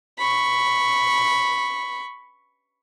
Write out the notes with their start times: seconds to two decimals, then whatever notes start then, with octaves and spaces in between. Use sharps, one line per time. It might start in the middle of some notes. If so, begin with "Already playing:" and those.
0.19 B5 C#6